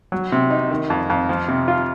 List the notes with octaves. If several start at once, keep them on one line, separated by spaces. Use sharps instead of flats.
F#3
C3
D#4
D#3
F2
F2
F3
C3
F4